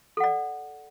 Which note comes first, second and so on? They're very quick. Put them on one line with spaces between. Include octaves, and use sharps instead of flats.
A4 F#5 D5